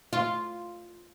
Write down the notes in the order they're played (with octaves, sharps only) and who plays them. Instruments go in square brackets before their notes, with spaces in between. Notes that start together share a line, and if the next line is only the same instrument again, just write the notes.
[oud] F4